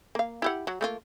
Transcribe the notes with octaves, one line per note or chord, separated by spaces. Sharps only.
A#3 F5
E4 G4 F#5
F#3
A3 A#3 F4